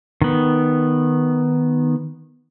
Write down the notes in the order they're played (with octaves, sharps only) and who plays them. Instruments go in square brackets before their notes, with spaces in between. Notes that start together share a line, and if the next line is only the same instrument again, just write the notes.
[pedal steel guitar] D#3 B3